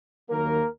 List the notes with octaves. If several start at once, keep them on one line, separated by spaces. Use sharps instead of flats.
D#2 D#3 F#3 A#3 A#4